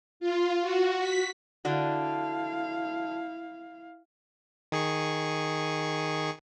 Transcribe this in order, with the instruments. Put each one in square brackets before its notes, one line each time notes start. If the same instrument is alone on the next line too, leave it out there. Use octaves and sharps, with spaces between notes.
[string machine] F4
F#4
B6
[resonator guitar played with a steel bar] D3 D4 F#4 [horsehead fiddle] E4 F5
[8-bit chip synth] D#3 G#4 C#6